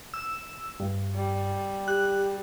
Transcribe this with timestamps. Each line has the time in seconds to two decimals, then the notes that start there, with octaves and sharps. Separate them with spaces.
0.14 E6
0.80 G2
1.15 G3
1.88 G4 F#6